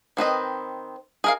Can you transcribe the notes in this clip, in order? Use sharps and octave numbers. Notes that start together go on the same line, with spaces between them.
D#3 C4 B4 D#5
G#4 A#4 F5